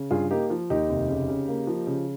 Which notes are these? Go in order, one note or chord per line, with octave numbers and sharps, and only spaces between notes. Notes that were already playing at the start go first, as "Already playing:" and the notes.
Already playing: C#3
G2 F4 G#4
A#3 D#4 G4
F3
D#2 D#4 G4
F1
C#3
C#3
A#3
F3
C#3